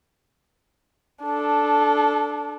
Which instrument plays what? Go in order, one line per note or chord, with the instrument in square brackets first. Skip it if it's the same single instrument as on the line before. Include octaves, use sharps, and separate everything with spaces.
[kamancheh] D4 A4